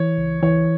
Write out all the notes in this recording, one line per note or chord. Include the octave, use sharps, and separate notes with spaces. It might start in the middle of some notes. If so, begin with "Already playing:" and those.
Already playing: E3 C#5
C#2
E3 C#5